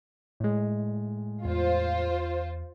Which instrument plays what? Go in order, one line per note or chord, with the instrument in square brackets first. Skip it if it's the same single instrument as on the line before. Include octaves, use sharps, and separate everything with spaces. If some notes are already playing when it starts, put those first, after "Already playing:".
[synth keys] A2 G#3
[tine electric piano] E2 [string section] F4 C5